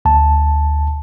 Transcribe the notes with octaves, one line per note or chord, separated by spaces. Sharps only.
D2 A5